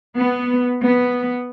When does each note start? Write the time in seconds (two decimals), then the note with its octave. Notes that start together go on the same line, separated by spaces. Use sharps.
0.17 B3
0.83 B3